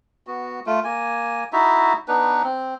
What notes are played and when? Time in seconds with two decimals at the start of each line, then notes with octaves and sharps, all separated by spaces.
0.27 B3 F#4
0.66 A3 F4
0.84 A#3 G#5
1.53 D#4 E4 F#4 E5
2.08 B3 D4 D#4 B4
2.44 C4